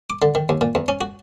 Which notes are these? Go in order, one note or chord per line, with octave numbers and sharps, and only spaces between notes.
D6
D3
D#3
D#2
A#2
E2
C#4
F#4